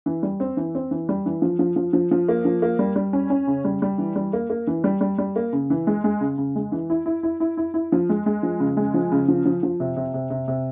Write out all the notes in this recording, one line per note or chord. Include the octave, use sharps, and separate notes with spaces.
E3
G3
C4
E3
C4
E3
G3
E3
F3
F3
F3
F3
F3
A#3
F3
A#3
G3
G3
C#4
C#4
C#3
G3
G3
E3
G3
A#3
A#3
E3
G3
G3
G3
A#3
C#3
E3
G#3
G#3
C#3
C#3
G#3
E3
E4
E4
E4
E4
E4
E4
F3
G#3
G#3
F3
C#3
G#3
F3
C#3
F3
F3
F3
C3
C3
C3
C3
C3